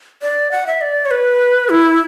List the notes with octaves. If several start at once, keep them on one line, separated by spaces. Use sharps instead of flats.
D5
F#5
E5
D5
C#5
B4
E4